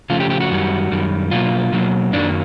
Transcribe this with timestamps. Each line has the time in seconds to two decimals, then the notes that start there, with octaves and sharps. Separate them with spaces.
0.10 C#3 F3 A3 F4
0.20 G4
0.30 G4
0.40 F#4
0.51 F#2 D#3 G3
0.91 F#2 D#3 G3
1.31 B2 F#3 A#3 F4
1.73 B2 F#3 A#3
2.12 F#2 D#3 F#3 A#3 D4